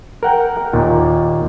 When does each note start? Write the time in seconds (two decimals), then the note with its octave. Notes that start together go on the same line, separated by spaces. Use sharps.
0.23 A#4 F#5 G5
0.73 D#2 A#2